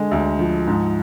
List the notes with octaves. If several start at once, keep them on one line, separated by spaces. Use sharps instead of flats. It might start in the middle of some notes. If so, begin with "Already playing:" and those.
Already playing: D3 G#3
D2
F3
G#2